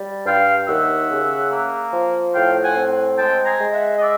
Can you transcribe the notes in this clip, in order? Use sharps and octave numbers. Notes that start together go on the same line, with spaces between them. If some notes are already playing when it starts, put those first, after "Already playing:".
Already playing: G3
G2 F5 G5
D#2 E5 F#5
C#3
A#3
F3
A2 F5 G5
F#5 G#5
C4
G#3 G5 A5
G#5 A#5
G#3
E5 F#5
D#5
D5 E5